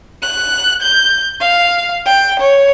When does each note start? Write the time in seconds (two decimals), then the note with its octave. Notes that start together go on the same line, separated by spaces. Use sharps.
0.22 F#6
0.82 G6
1.41 F5
2.06 G5
2.40 C#5